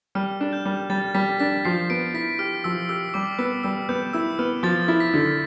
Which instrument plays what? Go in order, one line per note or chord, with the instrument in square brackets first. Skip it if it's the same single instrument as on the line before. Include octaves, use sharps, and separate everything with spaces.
[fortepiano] G3 [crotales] F6
[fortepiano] D4
[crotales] G6
[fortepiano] G3
[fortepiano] G3 [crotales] A6
[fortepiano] G3 [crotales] B6
[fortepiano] D4 [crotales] B6
[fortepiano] F3 [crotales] C7
[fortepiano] B3 [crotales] D7
[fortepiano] E4 [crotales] B6
[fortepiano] G4 [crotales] F6
[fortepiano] F3 [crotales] E6
[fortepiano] G4 [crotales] E6
[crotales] E6
[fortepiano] G3 [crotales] D6
[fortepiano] B3 [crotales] E6
[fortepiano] G3 [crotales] E6
[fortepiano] B3 [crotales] G6
[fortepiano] E4 [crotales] E6
[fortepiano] B3 [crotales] F6
[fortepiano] F3 [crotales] A6
[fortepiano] E4
[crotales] B6
[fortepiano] D3